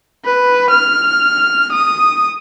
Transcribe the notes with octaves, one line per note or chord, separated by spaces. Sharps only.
B4
F6
D#6